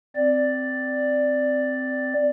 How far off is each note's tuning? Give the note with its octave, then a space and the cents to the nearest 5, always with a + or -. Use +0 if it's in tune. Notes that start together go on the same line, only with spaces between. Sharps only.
C4 -15 D5 +0